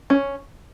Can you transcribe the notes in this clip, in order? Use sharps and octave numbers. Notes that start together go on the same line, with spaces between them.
C#4